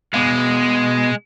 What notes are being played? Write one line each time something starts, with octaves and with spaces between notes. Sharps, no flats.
B2 G#3 B3 F5